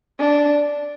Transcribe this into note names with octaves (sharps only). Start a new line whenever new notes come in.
D4